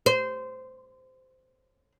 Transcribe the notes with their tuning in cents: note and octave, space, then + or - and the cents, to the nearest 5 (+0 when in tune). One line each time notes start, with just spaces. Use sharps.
C5 -20